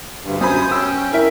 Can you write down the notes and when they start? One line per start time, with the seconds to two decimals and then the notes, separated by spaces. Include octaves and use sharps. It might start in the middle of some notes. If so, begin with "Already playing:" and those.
0.22 D2 G2
0.41 F#2 C5 G#5 B5 D#6
0.71 C#4 G5 E6
1.12 E4 A#4 E5